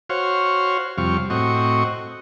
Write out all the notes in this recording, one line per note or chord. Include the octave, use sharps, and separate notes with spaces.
F#4 C5 C#5 F5
F2 C3 G3 F5 C#6
A2 C4 F#4 D#5 C#6